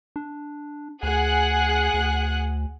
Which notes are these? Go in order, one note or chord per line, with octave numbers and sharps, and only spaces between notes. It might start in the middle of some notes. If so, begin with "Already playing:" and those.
D4
D2 G#4 F#5 F#6
D2